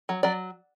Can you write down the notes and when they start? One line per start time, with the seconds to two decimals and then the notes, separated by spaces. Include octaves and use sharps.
0.09 F#3
0.23 F#3 D5